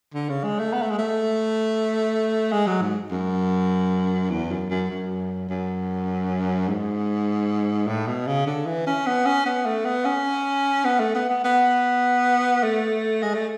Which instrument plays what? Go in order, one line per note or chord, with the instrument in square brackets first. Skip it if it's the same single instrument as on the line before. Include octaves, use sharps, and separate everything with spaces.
[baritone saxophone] D3
C#3
G#3
A3
B3
A3
G#3
A3
G#3
F#3
G#2
F#2
E2
F#2
F#2
F#2
F#2
G#2
A2
B2
C#3
D3
E3
C#4
B3
C#4
B3
A3
B3
C#4
B3
A3
B3
B3
B3
A3
G#3
A3